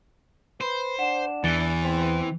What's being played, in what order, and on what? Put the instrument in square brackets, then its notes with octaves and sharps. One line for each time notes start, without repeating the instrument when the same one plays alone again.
[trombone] B4 [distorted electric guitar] C5
[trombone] D4 [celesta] F#5 E7
[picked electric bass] E2 [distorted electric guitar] E3 [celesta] A6 C#7 G7
[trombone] C4